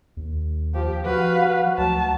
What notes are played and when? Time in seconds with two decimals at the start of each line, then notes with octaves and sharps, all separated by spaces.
0.17 D#2
0.75 F3 G4
1.06 F3 F#4 B4 F5
1.39 F#4
1.78 D2 F#3 A5